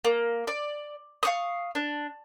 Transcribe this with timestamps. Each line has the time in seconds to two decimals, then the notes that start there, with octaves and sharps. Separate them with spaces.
0.04 A#3
0.47 D5
1.23 F5 C#6 D#6
1.75 D4